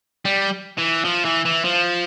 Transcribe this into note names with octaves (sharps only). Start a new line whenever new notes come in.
G3
E3
F3
E3
E3
F3